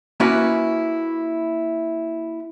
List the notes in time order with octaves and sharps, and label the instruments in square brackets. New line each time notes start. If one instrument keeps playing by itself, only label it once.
[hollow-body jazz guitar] A#3 C#4 E4 F#4 B4 F#5